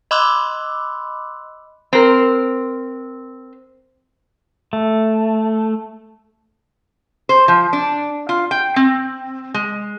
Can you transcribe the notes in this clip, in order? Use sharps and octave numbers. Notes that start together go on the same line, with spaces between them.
D#5 B5 C6 D6 E6 F#6
C4 A#4
A3
C5
F3
D4
F4
G5
C4
G#3